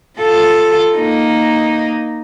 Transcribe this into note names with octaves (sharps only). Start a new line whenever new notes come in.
F4 A4
A#3 D#4